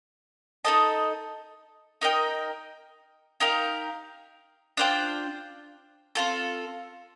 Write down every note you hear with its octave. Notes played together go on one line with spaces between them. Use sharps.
D#4 A4 D#5 A5
D#4 A#4 D#5 G5
D#4 G4 A#4 F5
D4 F4 C5 G5
C4 F4 A4